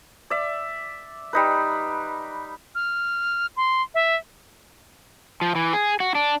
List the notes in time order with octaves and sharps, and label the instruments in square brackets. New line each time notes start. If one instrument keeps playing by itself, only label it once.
[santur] D5 E5
G3 D#4 B4
[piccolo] F6
C6
E5
[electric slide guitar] F3
E3
G#4
F#4
D4